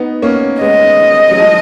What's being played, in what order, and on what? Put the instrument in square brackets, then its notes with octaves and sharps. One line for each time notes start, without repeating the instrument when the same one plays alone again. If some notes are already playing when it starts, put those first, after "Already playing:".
Already playing: [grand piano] B3 D#4
A#3 C#4
[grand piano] G#3 B3 [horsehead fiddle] D#5
[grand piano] F#3
F3 G#3